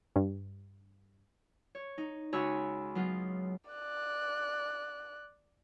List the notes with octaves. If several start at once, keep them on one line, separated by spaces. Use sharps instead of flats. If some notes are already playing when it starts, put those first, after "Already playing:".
G2
C#5
D#4
C#2 F#4 C#5 G#5 B5 E6
F#3 B3 F4
D5 F#6